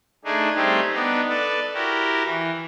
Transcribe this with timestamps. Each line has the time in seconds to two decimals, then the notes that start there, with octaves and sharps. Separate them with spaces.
0.25 A3 D4 D#4 G#4
0.56 G3 A3 C4 D#4 G4 G#4
0.93 B3 D4 D#4
1.29 A4 B4 D5
1.74 E4 F#4 G4 A#4
2.24 E3